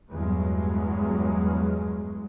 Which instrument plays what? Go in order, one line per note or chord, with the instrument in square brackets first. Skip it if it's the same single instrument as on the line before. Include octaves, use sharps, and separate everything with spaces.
[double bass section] E2 G2 F#3 G#3